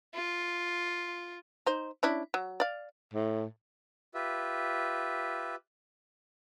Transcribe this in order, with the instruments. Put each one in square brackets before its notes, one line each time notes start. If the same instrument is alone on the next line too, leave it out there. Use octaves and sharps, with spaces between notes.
[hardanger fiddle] F4
[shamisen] D#4 C5
C#4 D4 E4
F#3
D5 F5
[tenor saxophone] A2
[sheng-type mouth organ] F4 G4 B4 E5